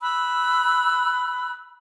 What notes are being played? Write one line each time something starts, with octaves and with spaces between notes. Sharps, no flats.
B5 E6 F#6